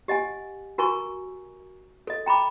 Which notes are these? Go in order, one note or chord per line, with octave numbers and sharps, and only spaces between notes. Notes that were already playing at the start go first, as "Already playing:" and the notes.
G4 D#5 F#5 G#5
F#4 A#4 G#5 A#5 C#6
A4 D#5
G5 A#5 B5 D6